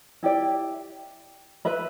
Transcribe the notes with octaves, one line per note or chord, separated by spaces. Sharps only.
E4 G4 D5
B4 E5 B5